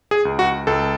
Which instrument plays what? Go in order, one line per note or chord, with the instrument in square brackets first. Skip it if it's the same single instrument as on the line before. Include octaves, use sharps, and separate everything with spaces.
[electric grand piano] G#4
C#2
F#4
C#2 A4